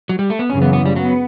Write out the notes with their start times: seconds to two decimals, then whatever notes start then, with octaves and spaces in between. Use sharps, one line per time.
0.09 F#3
0.19 G3
0.30 A3
0.39 B3
0.50 F#2 C#3 E3 C#4
0.62 B3
0.73 B3
0.86 G3
0.96 F#3 B3